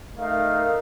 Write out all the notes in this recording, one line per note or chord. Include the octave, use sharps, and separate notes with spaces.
A3 D#4 A#4 F5